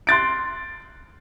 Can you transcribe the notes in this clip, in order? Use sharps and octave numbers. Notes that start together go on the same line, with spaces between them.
C6 F#6 A6 D7